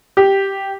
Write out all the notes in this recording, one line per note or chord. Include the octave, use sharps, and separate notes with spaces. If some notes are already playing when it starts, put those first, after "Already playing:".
G4